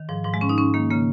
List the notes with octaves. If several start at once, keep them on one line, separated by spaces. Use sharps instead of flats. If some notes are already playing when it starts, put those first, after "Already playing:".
Already playing: D#3
G#2 F3
G#2 F3
G#3
G#2 C#4
D#4
G#2 C#4
D#3 A#3
C#3 A#3